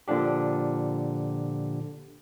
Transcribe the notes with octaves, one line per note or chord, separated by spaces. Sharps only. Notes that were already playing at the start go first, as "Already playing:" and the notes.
A#2 D3 F3 D4 G4